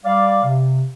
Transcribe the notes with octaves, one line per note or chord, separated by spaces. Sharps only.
G3 D5 F5
C3